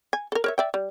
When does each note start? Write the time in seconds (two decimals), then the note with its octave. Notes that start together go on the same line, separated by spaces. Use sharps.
0.13 G#5
0.32 A4 A#4
0.44 A#4 C#5 E5
0.58 D5 E5 G5
0.74 G3